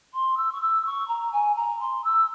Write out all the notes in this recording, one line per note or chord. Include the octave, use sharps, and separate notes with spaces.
C6
E6
C#6
E6
C#6
A#5
G#5
A#5
C6
E6